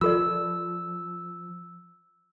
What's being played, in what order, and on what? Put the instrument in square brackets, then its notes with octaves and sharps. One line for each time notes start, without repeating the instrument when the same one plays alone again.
[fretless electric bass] F3 [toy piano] F4 A4 D5 [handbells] E6